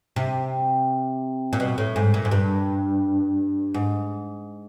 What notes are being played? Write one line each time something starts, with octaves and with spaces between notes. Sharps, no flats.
C3
A#2
B2
A2
G#2
A#2
G#2
G2
G#2